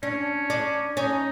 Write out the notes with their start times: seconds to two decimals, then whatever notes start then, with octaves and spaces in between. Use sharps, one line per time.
0.03 C#4 D4
0.50 D4
0.97 C#4 D#4